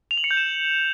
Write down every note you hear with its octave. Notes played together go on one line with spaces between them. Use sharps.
F7
F#7
C#7
G6
E7